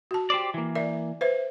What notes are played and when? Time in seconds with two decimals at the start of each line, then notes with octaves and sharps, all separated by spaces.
0.11 F#4 A5
0.30 G4 C5 D5
0.54 E3 A#3
0.75 A#4 D5 E5
1.21 B4 C5 E5